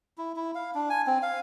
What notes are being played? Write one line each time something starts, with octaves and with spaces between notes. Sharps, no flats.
E4
E4
F5
D4
G#5
C4
F5